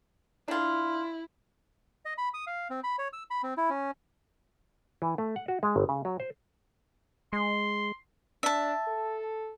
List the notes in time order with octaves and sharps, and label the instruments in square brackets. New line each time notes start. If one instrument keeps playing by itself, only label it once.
[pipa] D4 F4 [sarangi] E4
[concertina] D#5
B5
D#6
F5
C4
B5
C#5
E6
B5
C4
E4
C#4
[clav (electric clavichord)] E3
A3
F#5
F#4
G#3
G1
C#3
F#3
C5
[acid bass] G#3 [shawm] C6
[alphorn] D4 [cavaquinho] E5 A5
[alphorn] A4